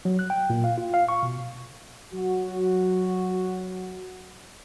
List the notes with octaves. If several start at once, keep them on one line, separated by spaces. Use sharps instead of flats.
F#3
F#6
G5
A#2
F5
F4
F5
C#6
B2
F#3 F#4